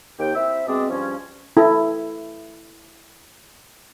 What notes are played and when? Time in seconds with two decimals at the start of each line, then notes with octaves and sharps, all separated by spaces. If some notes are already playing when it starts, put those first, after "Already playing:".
0.19 D#2 G5
0.34 C4 E4 E5
0.67 B2 G#3 C4 D4 D#5
0.90 G2 F3 C#4
1.57 E4 A4